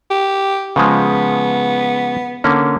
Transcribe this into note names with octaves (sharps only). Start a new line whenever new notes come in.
G4
C#3 F3 G#3 B3
D3 A#3 C#4